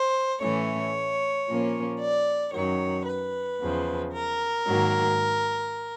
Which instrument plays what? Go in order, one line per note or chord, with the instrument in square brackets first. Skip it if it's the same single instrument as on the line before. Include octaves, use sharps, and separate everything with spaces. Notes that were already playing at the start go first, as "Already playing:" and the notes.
Already playing: [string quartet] C5
A2 E3 A3 C#4 C#5
A#2 F3 A#3 C#4
D5
F#2 D#3 F#3 C#5
B4
E2 C#3 F3
A#4
G#2 D#3 F#3 A#3